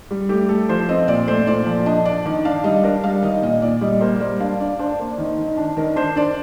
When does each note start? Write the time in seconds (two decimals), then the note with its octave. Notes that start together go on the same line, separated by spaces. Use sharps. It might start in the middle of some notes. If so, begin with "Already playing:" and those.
0.11 G3
0.29 A3 G4
0.49 A3 A4
0.69 F3 C5
0.89 C4 D#5
1.08 A#2 D5
1.27 A3 C5
1.47 A#2 D5
1.67 F3
1.86 D4 D#5
2.05 D4 D5
2.26 D#3 D5
2.45 D4 F5
2.64 G3 D#5
2.84 D4 A#4
3.04 G3 F5
3.23 D#3 D#5
3.43 A#2 D#5
3.62 A#2 D5
3.81 G3 D#5
4.01 A#3 C5
4.20 G3 D5
4.40 D4 F5
4.60 D4 D5
4.79 D4 C5
4.99 A#3
5.18 D#3
5.38 D#3
5.57 D4
5.77 D#3 A#4
5.96 D4 C5
6.16 D4 D5